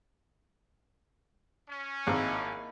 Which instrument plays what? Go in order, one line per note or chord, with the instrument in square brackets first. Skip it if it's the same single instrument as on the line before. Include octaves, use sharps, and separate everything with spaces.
[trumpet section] C#4
[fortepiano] G#1 [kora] A#3 E4